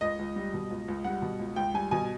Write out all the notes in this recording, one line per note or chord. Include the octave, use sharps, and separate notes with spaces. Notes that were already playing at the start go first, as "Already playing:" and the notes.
C#2 D#5
C#2
G3
B2
C#2
C#2
G3 F#5
B2
C#2
C#2 G5
G3 G#5
B2 G#5